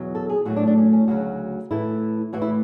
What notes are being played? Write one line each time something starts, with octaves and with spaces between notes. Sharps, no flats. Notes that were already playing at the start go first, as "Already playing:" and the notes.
Already playing: E2 B2 F#3
A4
G#4
A2 F#3 A3 F#4
D4
D4
C#4
C#4
D2 C#3 F#3 F#4
A2 E3 A3 E4
A2 E3 A3 F#4
E4